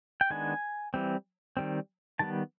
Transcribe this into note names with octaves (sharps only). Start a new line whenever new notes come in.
G5
D#3 G#3 B3 D4 G#5
E3 G3 C4
D#3 G3 C4
D#3 G3 B3 A5